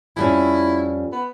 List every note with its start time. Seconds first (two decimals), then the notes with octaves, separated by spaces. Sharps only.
0.16 F2 G3 C#4 E4
1.12 B3